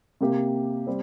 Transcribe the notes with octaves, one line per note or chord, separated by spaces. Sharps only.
C3 A#3 G4
G3 C4